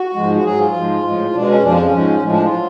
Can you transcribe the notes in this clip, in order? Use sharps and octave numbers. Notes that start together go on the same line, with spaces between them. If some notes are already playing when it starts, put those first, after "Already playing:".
Already playing: F#4
G#2 F3 G#3
F#4
G#2 F#3 G#4
F4
G#2 F3 G#3
A2 F3 G#3
B2 G#3 D4
C#4
F2 F3 G#3 D4
F4
C#4
G#2 F3 G#3
A2 F3 G#3
D4
F4
F#3